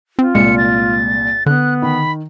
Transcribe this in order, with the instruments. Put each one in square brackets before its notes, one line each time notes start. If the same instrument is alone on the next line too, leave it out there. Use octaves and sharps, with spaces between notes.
[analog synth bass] C4 [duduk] F4
[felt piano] C2 A#2 [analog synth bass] G#3 [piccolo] C#7
[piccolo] A6
[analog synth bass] D3 [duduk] B3 [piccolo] F#6
[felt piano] D#3 [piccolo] B5